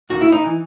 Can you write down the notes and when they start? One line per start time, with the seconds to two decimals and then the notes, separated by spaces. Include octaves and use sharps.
0.09 D#2 D#3 F#4
0.21 E4
0.32 D#4
0.44 E3